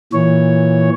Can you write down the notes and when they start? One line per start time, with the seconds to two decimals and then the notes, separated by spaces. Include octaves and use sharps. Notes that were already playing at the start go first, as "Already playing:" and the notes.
0.13 A#2 E3 C#5